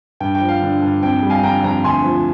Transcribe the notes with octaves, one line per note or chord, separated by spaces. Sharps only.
G2 G5
G5
F3
F5
D3
G2
F2 G5
G3
F5 G#5
D3 G5 A#5
F2 G5 A#5
D2 G#5 C6
F3